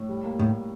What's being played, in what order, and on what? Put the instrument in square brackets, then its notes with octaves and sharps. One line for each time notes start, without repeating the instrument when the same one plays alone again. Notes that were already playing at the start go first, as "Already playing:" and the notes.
Already playing: [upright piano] A2
G3
A#3
[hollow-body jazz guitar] A2 [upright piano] G3